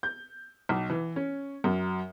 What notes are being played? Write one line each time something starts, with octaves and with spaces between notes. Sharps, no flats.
G6
B1
E3
C#4
F#2